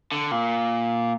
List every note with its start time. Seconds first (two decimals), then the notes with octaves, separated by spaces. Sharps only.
0.12 D3
0.32 A#2